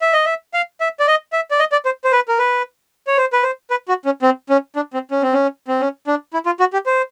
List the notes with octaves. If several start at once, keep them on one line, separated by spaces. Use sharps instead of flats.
E5
D#5
E5
F5
E5
D5
D#5
E5
D5
D#5
D5
C5
C5
B4
A#4
B4
C#5
C5
B4
C5
B4
F#4
C#4
C4
C#4
D4
C4
C#4
C4
C#4
C4
C#4
D4
E4
F4
F#4
G4
C5